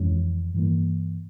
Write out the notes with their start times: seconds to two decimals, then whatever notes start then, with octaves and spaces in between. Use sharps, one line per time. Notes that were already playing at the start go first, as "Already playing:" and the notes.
Already playing: F2 E3 G#3 C#4
0.54 G2 E3 A#3